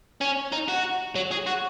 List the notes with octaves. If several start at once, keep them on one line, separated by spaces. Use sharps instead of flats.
C#4
D#4
F#4
F#3
G#4
F#4